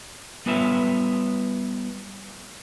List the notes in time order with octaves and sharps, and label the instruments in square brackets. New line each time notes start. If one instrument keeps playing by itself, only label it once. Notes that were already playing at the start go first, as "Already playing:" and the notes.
[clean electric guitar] G3 B3 F4 B4 C#5 E5